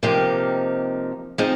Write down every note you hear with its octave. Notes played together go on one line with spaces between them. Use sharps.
C3 F3 A#3 D#4 G4
F3 C4 D#4 G#4